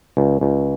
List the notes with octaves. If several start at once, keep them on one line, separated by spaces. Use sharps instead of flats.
C#2
C#2